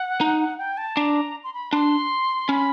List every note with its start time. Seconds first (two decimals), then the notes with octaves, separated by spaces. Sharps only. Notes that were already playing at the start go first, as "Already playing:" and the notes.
Already playing: F#5
0.21 D#4
0.58 G5
0.77 A5
0.96 D4 A#5
1.44 C6
1.54 B5
1.72 D4 C6
2.49 C#4 B5